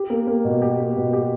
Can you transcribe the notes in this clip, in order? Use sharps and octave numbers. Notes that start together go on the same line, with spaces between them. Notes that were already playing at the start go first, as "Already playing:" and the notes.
Already playing: G4
A#3
A#3
B2
G4
A#3
B2
G4